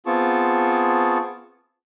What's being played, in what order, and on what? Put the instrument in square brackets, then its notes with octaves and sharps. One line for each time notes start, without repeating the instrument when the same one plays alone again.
[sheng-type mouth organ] B3 C4 F4 G#4 A5 C#6